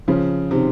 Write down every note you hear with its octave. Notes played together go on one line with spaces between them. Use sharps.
C#3 F3
C3 D#3